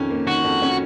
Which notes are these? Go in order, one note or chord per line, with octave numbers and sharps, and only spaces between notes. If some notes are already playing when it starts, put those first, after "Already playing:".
Already playing: F2 D#3 C#4
A#3
D#3 F#4
F2
C#4